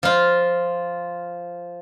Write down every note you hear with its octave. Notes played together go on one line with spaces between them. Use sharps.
F3 F4